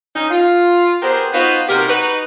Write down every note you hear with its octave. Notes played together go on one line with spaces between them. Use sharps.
C#4 D#4
F4
B3 G4 G#4 A#4 C5
B3 D#4 F4 F#4 B4 C5
C3 D#4 F#4 G4 A#4
D#4 F#4 B4